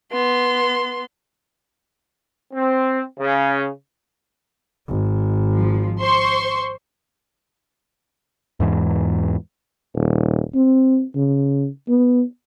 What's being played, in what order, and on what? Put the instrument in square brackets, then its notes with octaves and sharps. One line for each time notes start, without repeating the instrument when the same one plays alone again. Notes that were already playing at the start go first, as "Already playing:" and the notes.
[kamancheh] B3 C6
[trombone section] C4
C#3
[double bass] G#1
[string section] F3
C5 C6 C#6
[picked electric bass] E2 G#2 E3
[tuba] D#1
C4
C#3
B3